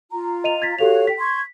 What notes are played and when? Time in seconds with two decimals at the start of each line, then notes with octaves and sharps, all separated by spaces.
0.11 F4 A#5
0.44 D#5 D#7 F7
0.62 G#6 A6 B6
0.79 F#4 G4 A4 C#5 F5 F7
1.07 G5 B6
1.19 C6 C#6 G#6